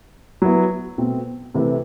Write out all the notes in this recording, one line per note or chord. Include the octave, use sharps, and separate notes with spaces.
F#3 B3 E4
B2 A3 C4
C3 E3 A3 E4 G4